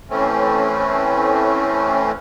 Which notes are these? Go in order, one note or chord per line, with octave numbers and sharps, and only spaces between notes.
E3 A3 C4 C#4